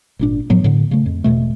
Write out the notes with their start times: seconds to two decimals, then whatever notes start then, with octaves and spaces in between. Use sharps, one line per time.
0.19 G#1 A#2 D4
0.50 A2 F3 F#3 B3
0.64 A2 D3
0.91 C#3 A3
1.06 F2
1.24 E1 F2 B2 A3